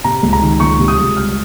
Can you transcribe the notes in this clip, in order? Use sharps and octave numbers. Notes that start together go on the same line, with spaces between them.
C3 A#5
C#2
A#5
D#3
C#2 C#6
C3
D#6
C#2
G3 F6